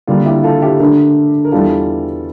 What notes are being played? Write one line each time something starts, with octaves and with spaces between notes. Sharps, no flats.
D3 G3 A#3 D4 F4
E4 G4
F4 A4
E4 G4
D3 A3 D4 G4 A#4
A#4
E2 E3 G3 D4 F4 A4